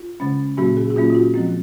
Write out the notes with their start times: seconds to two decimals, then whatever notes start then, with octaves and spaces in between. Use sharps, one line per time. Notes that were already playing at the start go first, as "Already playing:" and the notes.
Already playing: F4
0.20 C#3 G#3 C#4
0.58 A#2 F#3 A#3 C#4 F#4
0.77 G#4
0.90 F#4
0.96 A#2 F#3 A#3 C#4 F4
1.10 F4
1.15 F#4
1.34 F3 G#3 C4